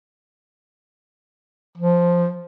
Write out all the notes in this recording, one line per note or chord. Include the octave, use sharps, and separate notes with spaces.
F3